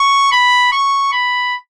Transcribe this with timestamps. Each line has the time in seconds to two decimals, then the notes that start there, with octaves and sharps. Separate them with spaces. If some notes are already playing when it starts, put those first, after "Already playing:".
Already playing: C#6
0.32 B5
0.72 C#6
1.12 B5